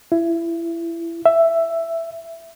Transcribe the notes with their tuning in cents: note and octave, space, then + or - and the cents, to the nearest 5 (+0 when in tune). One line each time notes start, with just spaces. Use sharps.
E4 +25
E5 +10